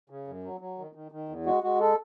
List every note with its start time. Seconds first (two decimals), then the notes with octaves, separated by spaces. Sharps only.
0.10 C#3
0.27 F#2
0.44 F#3
0.61 F#3
0.79 D#3
0.95 D#3
1.12 D#3
1.29 E2
1.46 G#3 F#4
1.63 G#3 F#4
1.80 A4